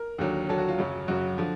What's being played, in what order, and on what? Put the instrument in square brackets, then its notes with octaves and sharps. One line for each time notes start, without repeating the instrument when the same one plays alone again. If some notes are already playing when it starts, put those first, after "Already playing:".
Already playing: [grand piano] A#4
D#2 D3 F#3
D#2 D3 F#3 A4
F#4
F4
F#2 C#3 F#3
F#2 C#3 F#3 F#4
D3 F3